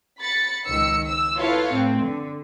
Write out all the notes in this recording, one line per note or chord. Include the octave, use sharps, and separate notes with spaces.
B5 A6 C#7
C#2 D#3 E6 C#7
E6
E4 F4 A4 B4 C#5 F5
A2 C4
D3